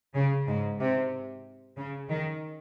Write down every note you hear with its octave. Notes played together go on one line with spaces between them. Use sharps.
C#3
G#2
C3
C#3
D#3